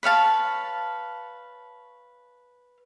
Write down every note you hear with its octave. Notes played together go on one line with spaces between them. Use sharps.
B4 C#5 F5 A5